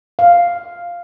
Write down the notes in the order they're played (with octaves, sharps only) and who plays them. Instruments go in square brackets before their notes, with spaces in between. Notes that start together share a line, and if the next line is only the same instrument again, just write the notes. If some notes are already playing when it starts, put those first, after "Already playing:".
[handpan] F5